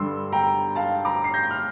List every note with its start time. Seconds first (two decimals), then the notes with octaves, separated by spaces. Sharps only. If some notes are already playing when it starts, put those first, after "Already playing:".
Already playing: G2 D3 G3 C6 E6
0.32 G5 A#5
0.75 F5 A5
1.05 A#5 D6
1.24 C7
1.34 G6 A#6
1.51 F6